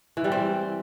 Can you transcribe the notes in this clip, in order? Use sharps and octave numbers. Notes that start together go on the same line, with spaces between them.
E3
G3
C4